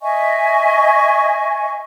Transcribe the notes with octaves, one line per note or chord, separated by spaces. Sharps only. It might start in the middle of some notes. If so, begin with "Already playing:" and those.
D#5 E5 G#5 C#6